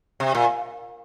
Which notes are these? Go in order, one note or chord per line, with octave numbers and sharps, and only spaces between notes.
C3
A#2